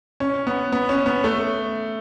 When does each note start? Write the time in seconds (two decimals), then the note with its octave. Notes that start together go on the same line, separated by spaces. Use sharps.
0.20 C#4
0.47 B3
0.72 B3
0.89 C#4
1.06 B3
1.24 A3